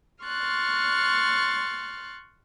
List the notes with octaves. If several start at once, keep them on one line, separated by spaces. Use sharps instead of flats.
C6 C#6 F6 F#6 A6